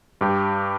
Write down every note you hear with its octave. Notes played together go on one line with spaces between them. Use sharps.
G2 G4